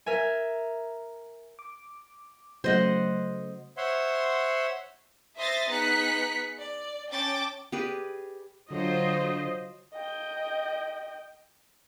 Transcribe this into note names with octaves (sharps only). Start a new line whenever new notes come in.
A#4 E5 G#5
D6
C#3 F#3 A3 C5 D#5 F#5
C5 C#5 E5 F#5 C6
C5 E5 C6 D#6 A6 A#6
B3 D#4 G#4 F#6 B6 C#7
D5
C#4 G5 A5 D6 A6
G4 G#4 B4 D5
D3 F#3 F4 C5 D#5
D#5 G5